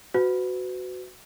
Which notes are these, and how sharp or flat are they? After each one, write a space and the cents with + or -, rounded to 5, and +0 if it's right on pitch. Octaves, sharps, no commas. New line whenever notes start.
F#4 +0 B4 +35